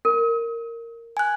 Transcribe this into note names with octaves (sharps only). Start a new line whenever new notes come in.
A#4
G#5 F#6